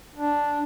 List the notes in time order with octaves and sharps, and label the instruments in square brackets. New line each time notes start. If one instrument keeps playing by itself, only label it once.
[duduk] D4